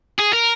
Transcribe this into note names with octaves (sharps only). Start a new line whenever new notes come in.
G#4
A#4